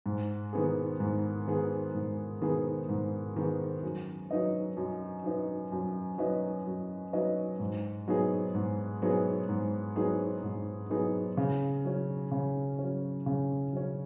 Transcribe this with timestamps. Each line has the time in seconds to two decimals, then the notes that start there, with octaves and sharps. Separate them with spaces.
0.06 G#2
0.53 D#3 B3 G#4
1.00 G#2
1.48 D#3 B3 G#4
1.94 G#2
2.42 D#3 B3 G#4
2.89 G#2
3.36 D#3 B3 G#4
3.83 F#2
4.31 F#3 D#4 B4 D#5
4.77 F#2
5.24 F#3 D#4 B4 D#5
5.72 F#2
6.18 F#3 D#4 B4 D#5
6.66 F#2
7.13 F#3 D#4 B4 D#5
7.60 G#2
8.08 F#3 B3 D#4 G#4
8.55 G#2
9.02 F#3 B3 D#4 G#4
9.49 G#2
9.96 F#3 B3 D#4 G#4
10.43 G#2
10.90 F#3 B3 D#4 G#4
11.37 C#3
11.85 F#3 C#4
12.31 C#3
12.79 F#3 C#4
13.26 C#3
13.73 F#3 C#4